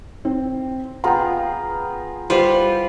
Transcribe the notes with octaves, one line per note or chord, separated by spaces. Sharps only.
C4
B3 F4 G#4 G5 A#5
G3 F4 B4 C5